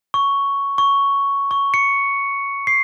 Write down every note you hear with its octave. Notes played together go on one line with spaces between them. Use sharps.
C#6
C#6
C#6
C#7
C7